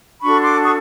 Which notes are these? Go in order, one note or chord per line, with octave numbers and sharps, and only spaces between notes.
D4 F#4 A4 B5 C#6
C6 D6
C#6 D#6